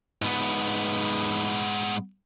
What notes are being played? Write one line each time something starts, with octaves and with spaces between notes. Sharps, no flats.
G#2 B3